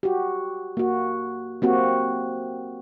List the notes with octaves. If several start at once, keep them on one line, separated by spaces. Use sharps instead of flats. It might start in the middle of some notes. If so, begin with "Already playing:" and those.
F#4 G4
A#3 F#4
A#3 C4 F#4 G4